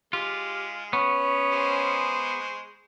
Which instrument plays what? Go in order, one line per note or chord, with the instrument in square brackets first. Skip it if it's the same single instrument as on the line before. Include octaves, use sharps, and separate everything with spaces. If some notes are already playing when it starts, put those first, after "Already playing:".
[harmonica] G#3 [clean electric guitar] F4 [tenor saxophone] G4
[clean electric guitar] B3 [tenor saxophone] C#4 [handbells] C#6
[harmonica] G#3 C5